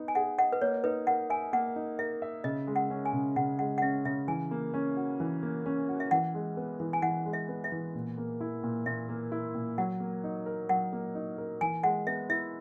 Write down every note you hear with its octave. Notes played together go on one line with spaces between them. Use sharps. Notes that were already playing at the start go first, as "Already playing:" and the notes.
Already playing: B3 D#4
G#5
G#4 F#5
D#5 F#5
B4
A#3 C#5
D#4 B4
A#4 F#5
E5 G#5
A#3 F#5
D#4
A#4 E5
E5
C#3 D#5
G#3
F#5
C#4
G#5
C#3
C#3 F#5
G#3 F#5
F#5
C#4 E5
C#3 E5
E3 G#5
A#3
C#4
F#4
E3
A#3
C#4
F#4
E5
E3 F#5
G#3
B3
E3
G#5
E3 F#5
G#3
E5
B3
E5
E3
A#2
A#3
E4
A#2
A#2 E5
A#3
E4
A#2
F#3 F#5
A#3
D#4
A#4
F#3 F#5
A#3
D#4
A#4
E3 G#5
G#3 F#5
B3 E5
E4 E5